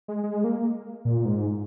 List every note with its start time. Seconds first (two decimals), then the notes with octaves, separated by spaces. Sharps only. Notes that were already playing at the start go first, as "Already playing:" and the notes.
0.08 G#3
0.23 G#3
0.44 A#3
1.05 A#2
1.25 G#2